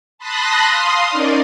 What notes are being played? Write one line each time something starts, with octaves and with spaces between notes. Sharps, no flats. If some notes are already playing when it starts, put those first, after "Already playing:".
A5 B5 C6 D#6 F#6 A#6
F5 C6 D#6
C#4 D#4 A#4 D5